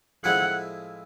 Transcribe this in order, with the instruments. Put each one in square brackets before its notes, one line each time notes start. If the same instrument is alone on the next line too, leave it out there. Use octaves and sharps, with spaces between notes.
[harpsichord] A2 F3 G#3 C4 E4 [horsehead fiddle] F#5